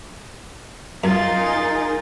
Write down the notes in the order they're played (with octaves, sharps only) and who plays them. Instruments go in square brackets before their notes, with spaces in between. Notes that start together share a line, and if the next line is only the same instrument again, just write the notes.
[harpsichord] F#2 [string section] D#4 G#4 A#4 [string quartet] F4 A6